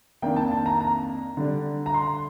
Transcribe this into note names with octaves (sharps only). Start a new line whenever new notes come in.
F2 D#3 A#3 D4 G5
A5
A5
A#5
A#5
D3 G3 D4
A#5
C6